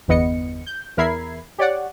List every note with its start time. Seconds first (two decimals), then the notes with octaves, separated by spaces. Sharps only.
0.08 G1 E2 B3 D#5 C#7
0.66 G6
0.97 E2 A#4 E5 B5 G#6 C7
1.58 G4 C#5 D5 F#5